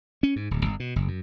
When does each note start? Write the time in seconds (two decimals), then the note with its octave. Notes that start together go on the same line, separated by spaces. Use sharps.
0.23 C#4
0.36 G#2
0.51 D1
0.65 G1
0.80 B2
0.96 F#1
1.08 F#2